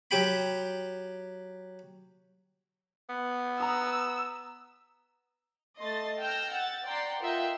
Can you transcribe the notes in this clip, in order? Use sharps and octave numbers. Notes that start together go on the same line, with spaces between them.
F#3 G4 G5 B5
B3
A#5 D#6 E6
A3 D#5 C6 A6
G5 E6 F6 G6 A#6
F#5 A6
D5 F#5 G5 A#5 C6
F4 A#4 D#5 E5 F#5 G5